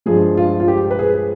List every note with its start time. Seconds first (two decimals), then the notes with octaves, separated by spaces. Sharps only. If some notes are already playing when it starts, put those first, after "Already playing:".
0.06 G2 F3 G#3 G#4
0.37 F4
0.60 F4
0.68 G4
0.91 B4
0.99 G#4